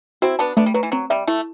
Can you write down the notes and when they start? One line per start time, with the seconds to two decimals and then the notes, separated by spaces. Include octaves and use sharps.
0.22 C4 E4 F#4
0.39 B3 D4 A5
0.57 A3 B3 D4
0.66 G3
0.74 F#3 B4
0.83 E3
0.92 F#3 C4
1.10 G3 E5
1.27 A3 E4